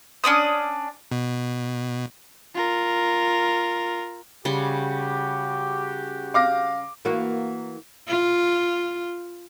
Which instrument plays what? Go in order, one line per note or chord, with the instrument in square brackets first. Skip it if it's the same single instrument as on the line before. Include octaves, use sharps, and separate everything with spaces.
[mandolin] C#4 D4 D5 D#6
[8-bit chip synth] B2
[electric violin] F4 A#4
[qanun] C#3 G3 C6 [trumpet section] F#4 G4
[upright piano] F5 D6 A#6
[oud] E3 A#3 F#4
[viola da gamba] F4